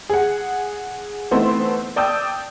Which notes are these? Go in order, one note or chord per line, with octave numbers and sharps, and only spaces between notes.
G#4 F#5
E3 A3 B3 C4 D#4 C5
D5 G5 A5 D#6 E6 G6